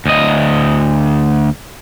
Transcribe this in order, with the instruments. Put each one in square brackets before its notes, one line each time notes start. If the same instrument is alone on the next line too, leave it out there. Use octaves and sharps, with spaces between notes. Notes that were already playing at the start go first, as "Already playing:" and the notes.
[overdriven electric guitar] D2 D#5